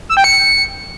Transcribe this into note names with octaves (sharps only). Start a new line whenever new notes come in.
E6
G5
C#7